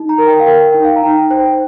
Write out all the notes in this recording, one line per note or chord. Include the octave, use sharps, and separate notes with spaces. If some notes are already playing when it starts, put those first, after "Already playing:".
Already playing: D#4
A#5
A#4
G5
F5
A#4 G5
D#4 G5
F5
A#5
D#4 G5
C5 G5